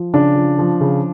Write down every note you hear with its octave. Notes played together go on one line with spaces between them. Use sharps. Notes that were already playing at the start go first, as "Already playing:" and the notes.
Already playing: F3
C#3 D4
F3
F3
C#3